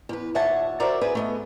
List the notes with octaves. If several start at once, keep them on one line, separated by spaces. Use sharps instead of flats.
E2 B4
D#2 A#2 C#5 E5 F#5 A5
F#4 A#4 C5 D5 E5
G#4 B4 D5 E5
A3 B3 D#5